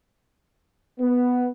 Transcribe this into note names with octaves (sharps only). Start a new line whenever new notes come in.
B3